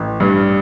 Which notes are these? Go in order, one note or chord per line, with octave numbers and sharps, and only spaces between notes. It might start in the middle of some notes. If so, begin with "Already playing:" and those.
Already playing: A1
G2